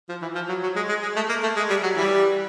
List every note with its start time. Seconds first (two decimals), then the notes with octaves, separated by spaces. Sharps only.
0.09 F3
0.22 E3
0.35 F3
0.49 F#3
0.63 F#3
0.76 G#3
0.89 G#3
1.02 G#3
1.16 A3
1.29 A#3
1.43 A3
1.56 G#3
1.70 G3
1.83 F#3
1.96 E3 G3